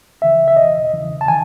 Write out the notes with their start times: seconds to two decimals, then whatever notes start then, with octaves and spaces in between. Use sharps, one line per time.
0.21 C#2 C#3 E3 E5
0.48 E5
0.56 E2 B2 D#5
0.92 E2 C#3 E3
1.21 A5
1.28 D#3 G#5